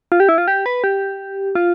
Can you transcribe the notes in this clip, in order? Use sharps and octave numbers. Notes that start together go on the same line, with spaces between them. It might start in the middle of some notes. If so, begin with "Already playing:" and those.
F4
G4
E4
F4
G4
B4
G4
F4